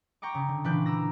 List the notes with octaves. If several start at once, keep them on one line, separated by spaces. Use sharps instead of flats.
G5 A#5 C#6 D6
C#3
D3
A#2 E3 D4 B4 D6 G6
A#5 D6 E6 A#6